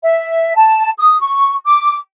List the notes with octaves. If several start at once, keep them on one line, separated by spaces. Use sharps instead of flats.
E5
A5
D#6
C#6
D6